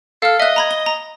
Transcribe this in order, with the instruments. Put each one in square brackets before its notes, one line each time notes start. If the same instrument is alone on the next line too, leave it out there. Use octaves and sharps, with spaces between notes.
[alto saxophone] A4 [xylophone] F5 F6
[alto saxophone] D#5 [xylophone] E5 F#6
[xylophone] A#5 B5 G#6
G7
A#5